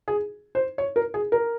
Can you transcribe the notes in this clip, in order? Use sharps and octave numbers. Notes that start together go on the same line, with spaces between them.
G#4
C5
C#5
A#4
G#4
A#4